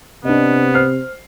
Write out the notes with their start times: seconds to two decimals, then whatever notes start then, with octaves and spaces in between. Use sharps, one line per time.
0.25 C3 B3 D4 D#5
0.74 C5 F6 C7